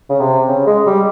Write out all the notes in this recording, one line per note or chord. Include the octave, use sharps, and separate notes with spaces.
C#3
C3
C#3
G#3
G3